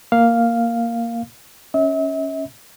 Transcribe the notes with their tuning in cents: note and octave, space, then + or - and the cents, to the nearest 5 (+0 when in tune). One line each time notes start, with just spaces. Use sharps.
A#3 -5 F5 +0
C#4 +0 E5 -40